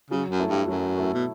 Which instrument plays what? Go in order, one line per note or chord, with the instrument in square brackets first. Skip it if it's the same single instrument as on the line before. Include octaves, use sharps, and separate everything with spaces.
[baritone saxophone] C#3 [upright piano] F#3
[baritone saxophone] F#2
[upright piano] A3 E4 A4
[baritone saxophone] G2
[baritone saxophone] F#2 [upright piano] F#3
[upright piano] A3 E4 A4
[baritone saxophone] B2